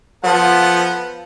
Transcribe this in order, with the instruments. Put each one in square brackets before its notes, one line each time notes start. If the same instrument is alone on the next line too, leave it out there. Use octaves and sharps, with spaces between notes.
[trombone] F3 [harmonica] B3 A4 F#5